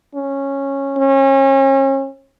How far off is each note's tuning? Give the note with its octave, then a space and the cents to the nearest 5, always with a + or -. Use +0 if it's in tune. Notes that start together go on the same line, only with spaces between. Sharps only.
C#4 -10
C#4 -35